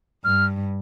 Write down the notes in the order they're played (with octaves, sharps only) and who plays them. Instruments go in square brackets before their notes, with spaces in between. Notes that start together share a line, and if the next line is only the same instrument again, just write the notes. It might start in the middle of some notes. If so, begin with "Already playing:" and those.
[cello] G2 [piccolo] F6